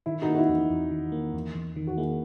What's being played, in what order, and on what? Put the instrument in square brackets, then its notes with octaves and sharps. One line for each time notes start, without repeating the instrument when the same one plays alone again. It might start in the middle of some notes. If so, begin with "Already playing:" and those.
[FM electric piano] D#3 [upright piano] E4
[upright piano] D#4 F#4
[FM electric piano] A#3
[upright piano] F#4
E4
[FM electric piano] E2
E2
D#3
A#3
E2
E2
D#3
[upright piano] F#4
[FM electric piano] A#3 [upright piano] E4 G#4